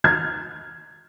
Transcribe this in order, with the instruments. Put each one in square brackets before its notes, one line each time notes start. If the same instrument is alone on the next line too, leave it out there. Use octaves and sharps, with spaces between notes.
[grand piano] F6 G#6